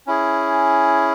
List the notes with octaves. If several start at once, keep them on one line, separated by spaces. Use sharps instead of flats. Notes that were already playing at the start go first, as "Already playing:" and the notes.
C#4 E4 G#4